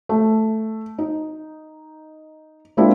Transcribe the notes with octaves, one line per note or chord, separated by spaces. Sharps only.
A3
D#4
G#3 A#3 C4 D4 E4 F4